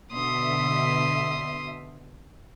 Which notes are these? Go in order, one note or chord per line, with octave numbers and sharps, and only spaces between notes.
B2 D3 E5 C6 D#6